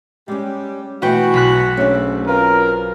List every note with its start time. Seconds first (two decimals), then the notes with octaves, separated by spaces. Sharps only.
0.28 G3 G#3 C#4 G4
1.02 B2 E3 A3 F#4 B4 G5
1.34 B1 B5 F#6
1.77 G#2 A3 C#4 D4
2.27 C4 F4 A#4 B4